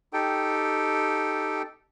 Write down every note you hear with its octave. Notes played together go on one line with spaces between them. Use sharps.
D#4 G4 A4 G5